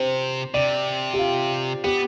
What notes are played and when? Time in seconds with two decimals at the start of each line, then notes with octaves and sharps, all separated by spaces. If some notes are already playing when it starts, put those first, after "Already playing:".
Already playing: C3 C5
0.54 C3 D5
1.14 G4
1.19 F4
1.84 B3 G4